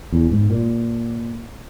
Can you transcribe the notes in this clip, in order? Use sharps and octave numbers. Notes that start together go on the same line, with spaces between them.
E2
G#2
A#2